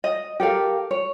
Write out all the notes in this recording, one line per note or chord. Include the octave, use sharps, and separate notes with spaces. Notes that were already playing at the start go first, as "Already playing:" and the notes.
D#5
G4 A4 A#4 F5
C#5